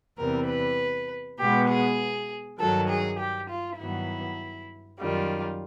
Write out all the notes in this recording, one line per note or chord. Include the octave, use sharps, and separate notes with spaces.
E2 C3 E3 G3 A#4
B4
B2 G#3 B3 G4
G#4
G2 D#3 F#3 A4
G#4
G4
F4
G2 D#3 F#3 B3 E4
F#2 D#3 G3 F4